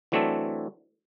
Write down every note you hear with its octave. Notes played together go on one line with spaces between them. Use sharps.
E3 F#3 A3 C4 D4 A4